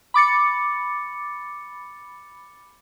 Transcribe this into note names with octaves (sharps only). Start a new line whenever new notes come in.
B5 D6 A6 C#7